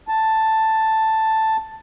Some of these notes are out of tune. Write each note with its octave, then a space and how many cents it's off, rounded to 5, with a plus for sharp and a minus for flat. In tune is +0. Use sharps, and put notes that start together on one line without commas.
A5 +5